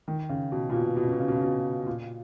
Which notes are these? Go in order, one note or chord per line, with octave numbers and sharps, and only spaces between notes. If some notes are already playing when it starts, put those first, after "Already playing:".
D#3
C#3
B2
A#2
B2
B2
C#3
B2
C#3
B2
C#3
B2
A#2